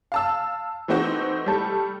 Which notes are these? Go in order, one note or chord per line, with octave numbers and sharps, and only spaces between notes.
F5 A5 E6
E3 A3 C4 D#4 F#4
G3 A3 A4